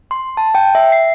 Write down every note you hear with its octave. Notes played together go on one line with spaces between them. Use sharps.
C6
A5
G5
E5
C7